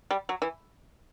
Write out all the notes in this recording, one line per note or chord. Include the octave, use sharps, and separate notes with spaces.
G3
F#3
E3